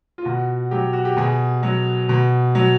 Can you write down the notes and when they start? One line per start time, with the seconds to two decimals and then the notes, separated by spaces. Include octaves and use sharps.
0.18 F4
0.25 B2 F#4
0.71 F#3 G4
0.93 F#4
1.05 G4
1.17 B2 G#4
1.63 F#3
2.09 B2
2.55 F#3